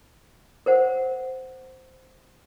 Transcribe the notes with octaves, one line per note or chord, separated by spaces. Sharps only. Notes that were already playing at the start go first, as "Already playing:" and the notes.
A#4 C5 F#5